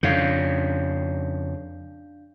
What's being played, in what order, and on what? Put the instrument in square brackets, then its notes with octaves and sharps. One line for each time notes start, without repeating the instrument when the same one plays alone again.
[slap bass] F2 C#3 [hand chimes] D4 F5 G6